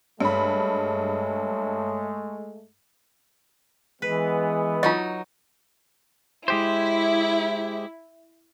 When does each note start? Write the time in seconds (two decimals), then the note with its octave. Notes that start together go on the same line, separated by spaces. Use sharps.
0.20 G2 G#3 A3 C#5 B5
4.02 E3 G#3 B3 B4
4.83 F#3 D#4 F4 D#5
6.48 G#3 E4 G4 C5